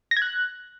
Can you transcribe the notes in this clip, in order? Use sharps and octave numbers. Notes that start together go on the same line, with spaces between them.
A#6
G#6
F#6